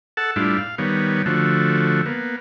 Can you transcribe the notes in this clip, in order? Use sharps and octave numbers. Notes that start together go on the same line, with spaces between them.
A4 F#5 A5
A2 G3 D4 E4 F4
F5
D#3 G3 B3 C#5
D3 F3 A3 F#4
A#3 B3